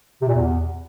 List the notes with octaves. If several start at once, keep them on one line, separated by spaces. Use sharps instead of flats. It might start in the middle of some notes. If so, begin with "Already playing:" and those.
C3
A#2
E2